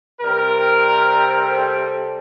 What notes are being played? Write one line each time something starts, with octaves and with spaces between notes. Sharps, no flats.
C3 G3 C4 A#4
A4